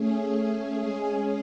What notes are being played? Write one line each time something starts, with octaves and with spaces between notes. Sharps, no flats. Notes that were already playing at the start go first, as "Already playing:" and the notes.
Already playing: A3 C#4 G#4
G#3 C#4 G#4